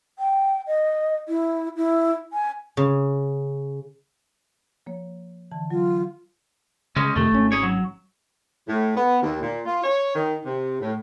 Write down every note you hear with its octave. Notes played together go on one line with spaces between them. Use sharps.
G5
D#5
E4
E4
G#5
C#3
F3 A#3 C#5
D3 E3 A5
F#3 F4
C#3 G#3 C#4
F2 C3 D#3 A3
G#1 C#4
G#4 C#5
F#3
A2
B3
D#2
A#2
F4
C#5
D#3
C3
A2